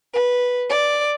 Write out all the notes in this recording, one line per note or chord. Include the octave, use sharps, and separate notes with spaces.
B4
D5